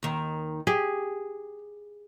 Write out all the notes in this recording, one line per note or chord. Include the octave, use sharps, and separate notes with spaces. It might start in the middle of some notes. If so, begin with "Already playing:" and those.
D#2 D#3
G4 G#4